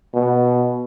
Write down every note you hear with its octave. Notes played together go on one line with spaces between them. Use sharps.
B2